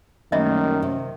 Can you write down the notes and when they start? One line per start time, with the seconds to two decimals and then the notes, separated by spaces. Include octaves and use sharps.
0.32 F#2 D#3 G3 A3 A#3 D#5 E5 B5
0.82 C3